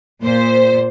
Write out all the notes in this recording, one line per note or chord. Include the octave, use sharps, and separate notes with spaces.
A#2 C5